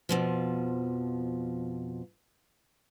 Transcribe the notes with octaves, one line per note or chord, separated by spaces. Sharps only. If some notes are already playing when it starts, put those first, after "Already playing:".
F2 B2 F3